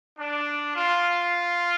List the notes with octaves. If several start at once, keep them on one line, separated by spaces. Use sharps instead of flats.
D4
F4